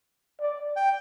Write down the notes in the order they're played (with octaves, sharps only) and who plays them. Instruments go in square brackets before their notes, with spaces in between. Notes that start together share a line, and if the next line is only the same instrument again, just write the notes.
[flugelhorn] D5
[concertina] G5